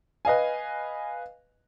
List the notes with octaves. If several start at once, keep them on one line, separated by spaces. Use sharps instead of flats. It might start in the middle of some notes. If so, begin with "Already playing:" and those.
B4 D#5 F5 G#5